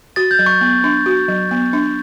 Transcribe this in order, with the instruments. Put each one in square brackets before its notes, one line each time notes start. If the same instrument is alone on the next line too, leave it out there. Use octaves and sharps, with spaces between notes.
[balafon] F#4 [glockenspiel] A6
[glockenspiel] G6
[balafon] F#3
[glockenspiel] C#6
[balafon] B3
D4
F#4
F#3
B3
D4